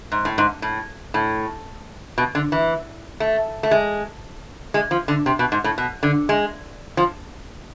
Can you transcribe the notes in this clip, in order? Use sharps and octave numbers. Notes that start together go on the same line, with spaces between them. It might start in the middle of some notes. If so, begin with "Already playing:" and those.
G#2
A2
G#2
A2
A2
B2
D3
E3
A3
A3
G#3
G#3
F3
D3
C3
B2
G#2
A2
B2
D3
G#3
F3